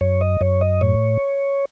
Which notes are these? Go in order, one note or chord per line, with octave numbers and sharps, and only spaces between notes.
F#2 C#5
D#5
F#2 C#5
D#5
A2 C#5